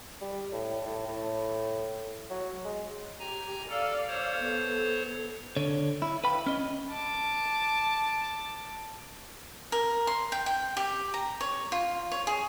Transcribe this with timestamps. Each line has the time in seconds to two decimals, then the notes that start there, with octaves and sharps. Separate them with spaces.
0.21 G3
0.52 A2
0.85 A2
1.07 A2
2.30 F#3
2.65 G#3
3.19 G4 G#5 A#5
3.69 A4 D5 F5
4.08 C5 C#5
4.38 B3 A4
5.56 D3 C#5
6.02 E4
6.24 B4 F5 G5 B5
6.46 C#4 D#5
6.89 A5 D6
9.72 A#4
10.07 C6
10.32 G5
10.46 G5
10.77 G4
11.14 A#5
11.41 C#5
11.72 F4
12.12 C#5
12.27 G#4